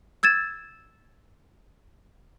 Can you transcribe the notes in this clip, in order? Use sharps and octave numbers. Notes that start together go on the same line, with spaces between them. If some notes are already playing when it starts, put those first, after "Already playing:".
E6 G#6 A6 E7